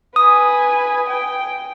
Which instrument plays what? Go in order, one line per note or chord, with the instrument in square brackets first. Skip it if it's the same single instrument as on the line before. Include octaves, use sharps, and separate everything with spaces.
[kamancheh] B4 G#5 [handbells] D#6
[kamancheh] G5